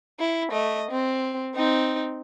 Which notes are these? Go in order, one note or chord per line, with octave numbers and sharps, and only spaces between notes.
E4
A3 D#5
C4
C4 D#4